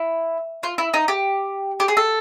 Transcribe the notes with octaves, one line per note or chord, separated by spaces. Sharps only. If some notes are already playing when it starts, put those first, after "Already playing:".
Already playing: E4
F4
E4
D#4
G4
G4
G#4
A4